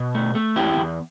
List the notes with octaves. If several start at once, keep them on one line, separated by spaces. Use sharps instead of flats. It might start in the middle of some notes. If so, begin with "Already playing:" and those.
Already playing: B2
A3
A3
E2 E4 G4
E2